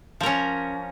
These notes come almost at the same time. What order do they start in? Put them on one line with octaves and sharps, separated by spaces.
F3 A#4 C#4